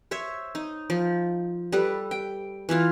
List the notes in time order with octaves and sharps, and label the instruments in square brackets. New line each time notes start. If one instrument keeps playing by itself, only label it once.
[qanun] C5 C#5 E5
D#4
F3
G3 A4 B4
G5
E3 E4 F4 F5